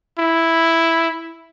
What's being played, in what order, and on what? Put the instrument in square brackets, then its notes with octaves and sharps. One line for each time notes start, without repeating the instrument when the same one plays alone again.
[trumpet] E4